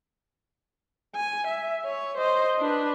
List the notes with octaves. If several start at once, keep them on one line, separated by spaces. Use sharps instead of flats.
G#5
E5
C#5
C5 D#5
D4 B4